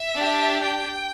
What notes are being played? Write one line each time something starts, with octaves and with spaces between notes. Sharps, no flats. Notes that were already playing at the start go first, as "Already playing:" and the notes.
Already playing: E5
D4 G4
G5